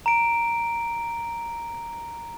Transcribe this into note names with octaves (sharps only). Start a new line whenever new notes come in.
A#5 D7